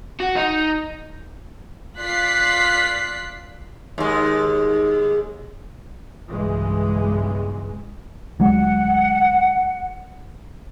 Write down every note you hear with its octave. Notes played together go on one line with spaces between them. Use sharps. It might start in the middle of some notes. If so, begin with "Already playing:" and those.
F#4
D#4
F4 D5 F#6 B6 C7
D#2 G#3
B1 G2 C#3 E3 G#3
D2 F#3 G#3 F#5